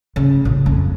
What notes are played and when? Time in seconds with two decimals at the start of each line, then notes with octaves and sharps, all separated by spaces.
0.16 C#3
0.45 A#1
0.66 F2